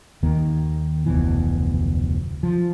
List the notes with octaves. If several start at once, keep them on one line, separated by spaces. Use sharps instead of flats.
D#2 D#3 A#3
F1 D2 B2 E3
F3